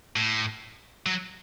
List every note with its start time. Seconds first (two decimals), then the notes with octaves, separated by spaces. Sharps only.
0.16 A2
1.06 F#3